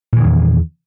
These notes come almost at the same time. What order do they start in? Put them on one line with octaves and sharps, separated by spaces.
A#2 E3 D#3 E2